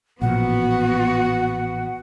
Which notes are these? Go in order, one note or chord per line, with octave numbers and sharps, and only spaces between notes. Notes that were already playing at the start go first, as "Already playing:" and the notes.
A1 A#2 F3 B3 F#4 F#5